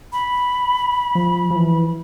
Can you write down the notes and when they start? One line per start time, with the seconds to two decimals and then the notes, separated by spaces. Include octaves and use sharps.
0.13 B5
1.15 F3
1.51 F3
1.56 E3